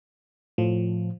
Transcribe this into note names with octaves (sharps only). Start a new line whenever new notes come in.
A2 F3